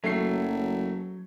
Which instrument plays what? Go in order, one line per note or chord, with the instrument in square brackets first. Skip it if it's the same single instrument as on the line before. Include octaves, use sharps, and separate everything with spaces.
[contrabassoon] F#1 [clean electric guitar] F#3 [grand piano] A3 C7